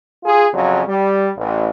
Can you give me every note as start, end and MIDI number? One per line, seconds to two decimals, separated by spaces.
0.24 0.46 65
0.24 0.46 68
0.52 0.81 41
0.52 0.81 49
0.52 0.81 54
0.87 1.28 55
1.37 1.68 33